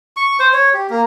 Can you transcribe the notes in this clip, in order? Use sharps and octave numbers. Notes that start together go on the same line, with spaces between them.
C#6
C5
C#5
G4
A#3